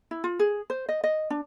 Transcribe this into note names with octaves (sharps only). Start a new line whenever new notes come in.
E4
F4
G#4
C5
D#5
D#5
D4